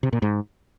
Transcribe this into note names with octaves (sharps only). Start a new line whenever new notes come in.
C3
A#2
G#2